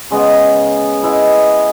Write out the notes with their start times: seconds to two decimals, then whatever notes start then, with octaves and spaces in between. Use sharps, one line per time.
0.10 C#3 G#3 B3
1.03 G#3 B3 E4 B4